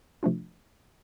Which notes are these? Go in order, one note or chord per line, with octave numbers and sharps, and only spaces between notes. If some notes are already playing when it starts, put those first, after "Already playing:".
C3 F3 A3 D4 F4